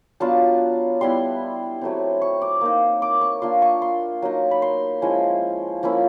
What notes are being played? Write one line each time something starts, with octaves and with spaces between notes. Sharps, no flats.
F#3 B3 D4 F4 A5
G3 B3 E4 C6
F#3 A3 C4
C#6
D6
A#3 D#4
D6
C#6
A#3 D4 F4 C6
C#6
C6
F#3 A#3 D#4
B5
C6
F3 G#3 C#4 E4
F3 A#3 C#4 E4